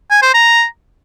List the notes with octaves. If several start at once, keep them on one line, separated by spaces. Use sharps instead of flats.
G#5
C5
A#5